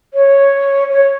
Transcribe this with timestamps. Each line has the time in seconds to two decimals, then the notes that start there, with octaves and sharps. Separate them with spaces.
0.14 C#5
0.92 C#5